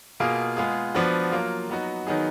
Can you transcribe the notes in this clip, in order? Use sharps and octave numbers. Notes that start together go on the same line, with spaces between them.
B2 A#3 F4 G#4
G#3 B3 F4 G#4
F3 B3 D4 F#4
F#3 A#3 F4
F#3 B3 D#4 F#4
D#3 F#3 B3 D#4 G#4